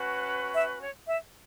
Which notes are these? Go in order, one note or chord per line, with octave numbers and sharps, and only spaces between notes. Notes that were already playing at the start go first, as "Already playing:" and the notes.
Already playing: C#4 F#4 B4
E5
C#5
E5